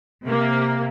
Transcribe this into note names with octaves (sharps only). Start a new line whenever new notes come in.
C3 A#3